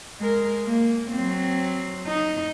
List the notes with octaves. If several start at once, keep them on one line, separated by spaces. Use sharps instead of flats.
G#3 A#4
A#3
F#3 C4
D#4